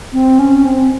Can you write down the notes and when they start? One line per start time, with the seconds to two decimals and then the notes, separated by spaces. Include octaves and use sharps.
0.13 C4
0.39 C#4
0.65 C4